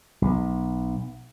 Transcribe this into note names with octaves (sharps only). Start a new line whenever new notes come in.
B1